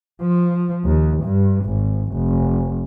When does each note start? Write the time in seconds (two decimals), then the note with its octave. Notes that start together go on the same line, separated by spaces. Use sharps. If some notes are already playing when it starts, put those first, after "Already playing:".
0.22 F3
0.85 D#2
1.23 G2
1.65 G#1
2.13 F1